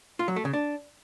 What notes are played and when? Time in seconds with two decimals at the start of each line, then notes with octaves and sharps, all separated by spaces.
0.19 F4
0.28 F#3
0.36 A3
0.45 C#3
0.53 D4